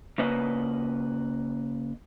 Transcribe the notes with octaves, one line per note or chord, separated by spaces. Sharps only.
C#3 A#3 B4 D#5